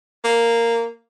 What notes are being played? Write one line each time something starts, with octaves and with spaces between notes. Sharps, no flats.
A#3